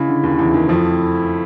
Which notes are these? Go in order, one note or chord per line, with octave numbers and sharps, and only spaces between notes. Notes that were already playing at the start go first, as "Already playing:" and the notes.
Already playing: C#3 G#3 C#4 E4
D3
D#2 D#3
E2 E3
D#2 D#3
F2 F3 A3 C4 E4